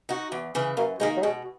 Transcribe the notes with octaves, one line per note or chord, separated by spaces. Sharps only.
D#4 F#4
E2
C#3 E3
F#2 A#3
D#3 G#3 A#3 D#4
F#3
B2 G#3